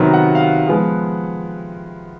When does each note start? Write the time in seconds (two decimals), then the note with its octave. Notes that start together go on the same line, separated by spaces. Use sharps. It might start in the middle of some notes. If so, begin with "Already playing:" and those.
Already playing: C3 D#3 F#3 B3 A#5
0.13 F#5
0.35 F5
0.40 F#5
0.67 F3 G#3 B3